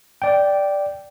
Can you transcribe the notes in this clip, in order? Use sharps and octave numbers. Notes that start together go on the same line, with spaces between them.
D5 G5